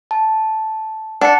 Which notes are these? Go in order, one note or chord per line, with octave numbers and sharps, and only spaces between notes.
A5
D4 F#5 C#7